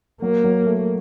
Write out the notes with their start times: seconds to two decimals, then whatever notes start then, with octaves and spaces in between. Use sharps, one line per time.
0.22 F#3 A#3
0.44 F#3
0.66 A3